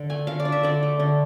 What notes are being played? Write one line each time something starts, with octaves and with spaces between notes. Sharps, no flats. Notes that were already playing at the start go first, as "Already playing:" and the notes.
Already playing: D3
A3 G#5
D3 F5
D5
D4
E5
D3 D5
A3
D3